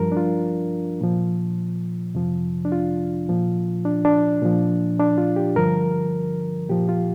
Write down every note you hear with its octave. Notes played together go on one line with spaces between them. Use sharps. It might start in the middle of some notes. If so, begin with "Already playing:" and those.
Already playing: G2 F3 A#4
D4
F4
A#2 F3
F2 C3 F3
D4
F4
A#2 F3
D4
D4
A#2 F3
D4
F4
G4
G2 D3 F3 A#4
A#2 F3 G4
F4